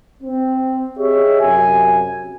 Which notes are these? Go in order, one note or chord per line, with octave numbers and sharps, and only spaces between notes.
C4
G4 G#4 C#5 D#5 E5
F#2 C3 G#5